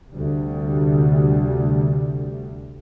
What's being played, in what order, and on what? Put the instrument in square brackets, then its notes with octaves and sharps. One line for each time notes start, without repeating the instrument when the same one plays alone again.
[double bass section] D2 C3 G3